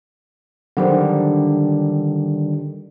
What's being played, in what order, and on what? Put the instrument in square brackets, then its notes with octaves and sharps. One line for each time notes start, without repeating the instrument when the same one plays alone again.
[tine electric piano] D3 D#3 G3 [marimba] F#3 D4 C5